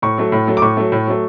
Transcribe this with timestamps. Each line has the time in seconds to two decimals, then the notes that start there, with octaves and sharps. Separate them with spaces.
0.02 A2 C#6
0.18 F#3 A3
0.32 A2
0.47 F#3 A3
0.57 D6
0.62 A2 C#6
0.77 F#3 A3
0.92 A2
1.07 F#3 A3